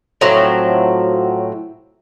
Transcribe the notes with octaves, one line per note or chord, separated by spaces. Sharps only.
A2 F3 F#3 C4